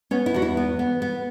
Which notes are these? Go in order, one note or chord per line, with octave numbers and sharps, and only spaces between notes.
B3 C#4
E4
E2 F#4
E4
B3
B3
B3